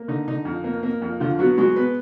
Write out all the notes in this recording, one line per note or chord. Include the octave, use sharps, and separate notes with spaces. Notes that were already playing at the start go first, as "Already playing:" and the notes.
Already playing: A#3
D3 D#4
D3 D#4
F2
A#3
A#3
F2
D3 F3 F4
F#3 B3 F#4
F#3 G#3 F#4
B3 B4